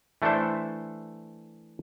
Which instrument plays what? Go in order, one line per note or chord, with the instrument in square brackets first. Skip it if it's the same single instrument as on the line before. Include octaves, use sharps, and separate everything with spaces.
[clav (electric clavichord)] E3 A3 D4 E4 A4 C5